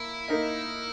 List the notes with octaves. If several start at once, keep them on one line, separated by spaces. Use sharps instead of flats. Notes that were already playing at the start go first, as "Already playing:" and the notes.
Already playing: A#3 E4
A#3 D#4 A#4 D#5